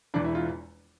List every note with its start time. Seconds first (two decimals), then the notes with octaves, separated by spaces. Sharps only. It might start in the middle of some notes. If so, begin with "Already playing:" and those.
0.14 E1 E2 E3 D4
0.25 E4
0.35 F4